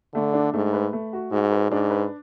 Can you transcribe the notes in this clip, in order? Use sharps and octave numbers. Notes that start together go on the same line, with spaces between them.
D3 A3
D4
G#2 A3
B4
A3
F#4
G#2 F#4
B4
G#2 D4
B4